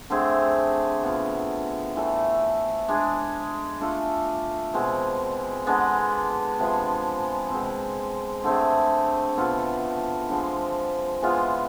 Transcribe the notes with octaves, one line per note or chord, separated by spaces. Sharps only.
D3 A3 C4 G#4
B2 B3 F4
A2 E3 A3
G#3 D4 G#4
A3 D4 F4 A4
B2 G#3 C4
D3 G#3 B3 D4
C3 F3 G#3 B3
B2 G#3 C4
D3 A3 C4 G#4
B2 B3 F4 A4
D3 F3 G#3 C4
E3 G#3 B3 F4